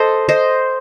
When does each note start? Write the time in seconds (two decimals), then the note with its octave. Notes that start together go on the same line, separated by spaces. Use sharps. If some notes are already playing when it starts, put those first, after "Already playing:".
Already playing: A4 C5 D#5
0.29 C5 D#5